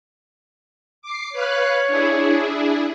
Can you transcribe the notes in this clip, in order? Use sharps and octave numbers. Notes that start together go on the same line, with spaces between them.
D6 C7
B4 C#5 F5 F#6
D4 E4 G#4